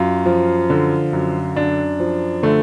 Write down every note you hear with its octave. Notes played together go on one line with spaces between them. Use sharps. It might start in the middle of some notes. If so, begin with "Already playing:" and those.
Already playing: F#2 F4
F3
D3
F#2
F#2 D4
F3
D3 A3